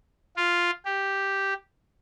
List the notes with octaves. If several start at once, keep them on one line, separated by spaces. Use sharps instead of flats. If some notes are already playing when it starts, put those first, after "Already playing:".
F4
G4